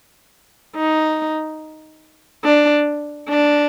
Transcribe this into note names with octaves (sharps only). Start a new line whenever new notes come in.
D#4
D4
D4